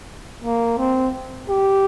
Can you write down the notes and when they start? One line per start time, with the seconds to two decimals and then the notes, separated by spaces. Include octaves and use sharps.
0.43 A#3
0.78 C4
1.49 G4